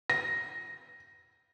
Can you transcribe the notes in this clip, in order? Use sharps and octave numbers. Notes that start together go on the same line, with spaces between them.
A#6